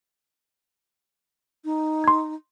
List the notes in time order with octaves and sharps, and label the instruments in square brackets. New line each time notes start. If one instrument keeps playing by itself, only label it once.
[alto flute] D#4
[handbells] C6 G#6